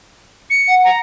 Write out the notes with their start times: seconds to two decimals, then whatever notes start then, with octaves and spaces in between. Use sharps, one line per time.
0.50 C#7
0.69 F#5
0.84 A#5